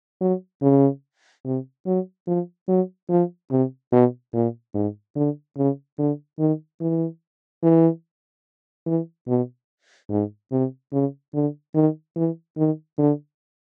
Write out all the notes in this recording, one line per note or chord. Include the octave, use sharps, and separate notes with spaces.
F#3
C#3
C3
F#3
F3
F#3
F3
C3
B2
A#2
G#2
D3
C#3
D3
D#3
E3
E3
E3
B2
G#2
C3
C#3
D3
D#3
E3
D#3
D3